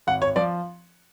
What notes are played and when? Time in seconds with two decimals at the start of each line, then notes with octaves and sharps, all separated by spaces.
0.07 G#1 F#5
0.22 C#5
0.36 F3 D5